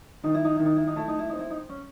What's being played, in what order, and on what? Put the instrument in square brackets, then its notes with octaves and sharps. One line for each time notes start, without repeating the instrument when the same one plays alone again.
[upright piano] D#3 [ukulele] D#4
[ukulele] E4
D#4
[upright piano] D#3 [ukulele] E4
[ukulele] D#4
E4
D#4
[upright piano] A3 [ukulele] E4
[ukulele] D#4
E4
[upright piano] C4 [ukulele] D#4
[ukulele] E4
D#4
C#4